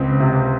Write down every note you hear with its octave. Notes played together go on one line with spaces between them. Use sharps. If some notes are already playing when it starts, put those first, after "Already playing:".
Already playing: C#2 C4
C3